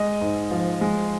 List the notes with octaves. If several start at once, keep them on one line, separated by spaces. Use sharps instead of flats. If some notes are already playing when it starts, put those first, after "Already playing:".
Already playing: G#3 D#5
G#2
F3
G#3